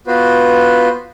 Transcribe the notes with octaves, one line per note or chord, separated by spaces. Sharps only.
B3 F4 F#4 B4 C5